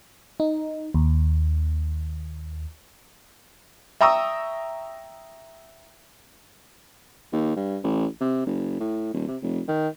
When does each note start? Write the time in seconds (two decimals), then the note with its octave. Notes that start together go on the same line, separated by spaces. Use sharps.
0.40 D#4
0.94 D#2
4.01 E5 G5 A#5 C#6 D#6 E6
7.32 D#2
7.56 G2
7.84 A1
8.21 C3
8.46 F#1
8.80 A2
9.14 D#1
9.28 C3
9.42 F1
9.68 D#3